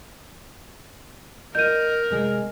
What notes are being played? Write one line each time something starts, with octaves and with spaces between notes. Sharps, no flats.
A#4 D#5 G6 D#7
C3 G#3 G#4